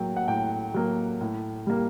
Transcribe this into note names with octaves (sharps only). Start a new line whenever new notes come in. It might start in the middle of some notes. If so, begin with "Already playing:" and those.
Already playing: A2 F#3 A#3 G5
F#5
A2 G5
F#3 A#3
A2
G3 A#3